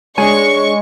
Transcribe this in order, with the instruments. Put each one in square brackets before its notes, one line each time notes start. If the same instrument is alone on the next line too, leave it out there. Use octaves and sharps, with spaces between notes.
[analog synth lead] G#3 [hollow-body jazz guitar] D4 G#4 G#5 [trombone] C#5 [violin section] C#6